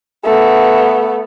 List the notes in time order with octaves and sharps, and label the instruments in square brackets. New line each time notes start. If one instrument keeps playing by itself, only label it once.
[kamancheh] A3 B3